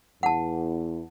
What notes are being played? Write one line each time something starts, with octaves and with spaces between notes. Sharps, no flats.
E2 F#5 A5